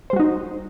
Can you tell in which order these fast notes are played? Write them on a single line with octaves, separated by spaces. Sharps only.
C5 G3 F#4 D#4